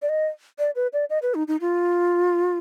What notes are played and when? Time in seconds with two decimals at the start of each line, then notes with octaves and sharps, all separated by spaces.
0.02 D5
0.09 D#5
0.59 D5
0.75 B4
0.93 D5
1.10 D#5
1.22 B4
1.34 D#4
1.48 D#4
1.61 F4